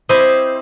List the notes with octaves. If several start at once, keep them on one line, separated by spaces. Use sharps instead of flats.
C4 E4 G4 C5 D#5